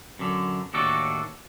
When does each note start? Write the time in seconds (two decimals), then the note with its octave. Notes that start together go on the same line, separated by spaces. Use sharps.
0.19 F#2 D3
0.74 D#2 A2 D4 F#4 A4